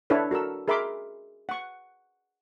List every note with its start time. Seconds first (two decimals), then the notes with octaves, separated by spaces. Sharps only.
0.10 D4 E4 A4 B4 C#5
0.31 F#4 A4 A#4 E6
0.68 G#4 A#4 E5 B5 C6 D6
1.49 F#5 C#6